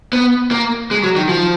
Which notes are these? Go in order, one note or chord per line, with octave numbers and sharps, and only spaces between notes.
B3
A#3
G#3
F#3
D#3
F3